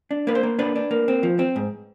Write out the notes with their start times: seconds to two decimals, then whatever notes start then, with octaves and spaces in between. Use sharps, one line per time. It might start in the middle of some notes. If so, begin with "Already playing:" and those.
0.11 D4
0.27 A#3 B4
0.35 C5
0.43 A#3
0.59 D4 B4
0.76 D4
0.91 A#3
1.08 C4
1.23 F3
1.39 C4
1.56 G#2